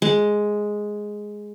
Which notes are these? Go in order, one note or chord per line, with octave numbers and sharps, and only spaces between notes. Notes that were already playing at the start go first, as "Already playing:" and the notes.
G#3